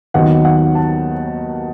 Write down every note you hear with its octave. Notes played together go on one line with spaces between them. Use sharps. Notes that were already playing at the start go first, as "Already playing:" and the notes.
D#2 D#3 F#3 B3 D#4 F#5
F#5
A5